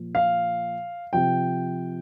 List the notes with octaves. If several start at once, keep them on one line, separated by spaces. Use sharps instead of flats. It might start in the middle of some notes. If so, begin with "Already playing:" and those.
Already playing: A#2 F3
F5
C3 F3 G5